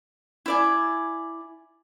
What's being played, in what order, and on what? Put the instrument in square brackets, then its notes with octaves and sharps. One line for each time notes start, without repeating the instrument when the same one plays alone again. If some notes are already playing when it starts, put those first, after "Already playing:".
[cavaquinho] E4 D5 G#5